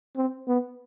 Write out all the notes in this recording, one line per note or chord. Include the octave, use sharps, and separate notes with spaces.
C4
B3